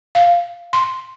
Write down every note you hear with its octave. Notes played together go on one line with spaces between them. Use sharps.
F5
C6